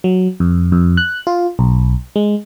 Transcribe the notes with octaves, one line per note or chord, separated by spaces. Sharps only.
F#3
F2
F2
F#6
F4
B1
G#3